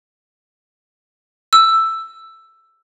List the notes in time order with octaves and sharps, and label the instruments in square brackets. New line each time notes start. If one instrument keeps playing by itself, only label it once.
[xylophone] E6